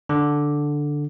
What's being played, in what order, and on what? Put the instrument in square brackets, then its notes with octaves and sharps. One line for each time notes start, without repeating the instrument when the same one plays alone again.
[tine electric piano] D3